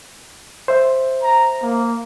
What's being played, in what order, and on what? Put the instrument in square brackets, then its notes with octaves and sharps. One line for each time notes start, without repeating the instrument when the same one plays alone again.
[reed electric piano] C5 E5
[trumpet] A#5
A#3